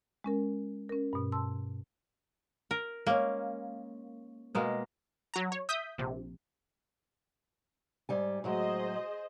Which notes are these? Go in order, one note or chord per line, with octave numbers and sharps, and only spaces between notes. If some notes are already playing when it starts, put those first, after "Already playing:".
G#3 C#4 A#4
C#4 A#4
G2 B2
A5 C6 E6
A#4
G#3 A#3 C#4
B2 G#3 A#3
F#3 A#5
C#5
E5 D#6 G6 B6
A#1 C3
G#2 G3 G#5
A2 F#3 G#3 G#4 C5 D#5